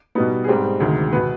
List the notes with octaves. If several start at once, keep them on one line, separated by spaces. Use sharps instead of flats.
B2 G3 B3 D#4
G#4
G#2 G3 C4 G4
D2 C3 D#3 G#3
B2 B3 B4